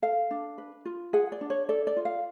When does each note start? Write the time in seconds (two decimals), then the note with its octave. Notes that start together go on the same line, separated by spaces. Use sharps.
0.02 A4 F5
0.31 D4
0.58 B4
0.85 F4
1.13 G#4 F#5
1.32 D5
1.41 D4
1.50 C#5
1.69 A4 D5
1.87 D5
1.97 F4
2.05 F5